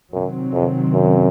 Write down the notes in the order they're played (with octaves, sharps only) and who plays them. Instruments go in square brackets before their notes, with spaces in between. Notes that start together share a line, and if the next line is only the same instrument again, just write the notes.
[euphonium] F#2 [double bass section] C3 D#3 F#3 C4
[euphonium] F2
F#2